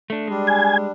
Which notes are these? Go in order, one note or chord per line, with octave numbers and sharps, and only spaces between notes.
A3 D4
G3 G#3 D4
G#5